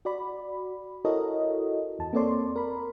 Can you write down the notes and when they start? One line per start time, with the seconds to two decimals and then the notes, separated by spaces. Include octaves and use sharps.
0.05 F#4 D5 B5
1.05 E4 F#4 A4 A#4 C#5 D#5
1.99 E2 A5
2.13 A#3 C4 A4 C#5 D5 C6
2.56 A#4 B5